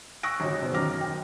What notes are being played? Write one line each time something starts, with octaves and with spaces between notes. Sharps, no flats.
C#6 D#6 E6 F#6 A#6 D7
G#1 C#3 C#4 F#4
B1 E2 C5
F#2 D#3 D6 F6 A#6
G5